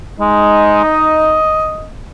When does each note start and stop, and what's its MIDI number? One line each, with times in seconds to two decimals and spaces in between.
0.20 0.82 56
0.20 1.39 63
0.84 1.88 75